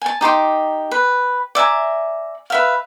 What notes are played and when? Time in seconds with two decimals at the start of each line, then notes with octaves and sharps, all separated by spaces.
0.02 G#5 A5
0.21 D#4 G4 C6 D6
0.91 B4
1.55 D5 E5 G#5 A#5
2.50 B4 E5 F5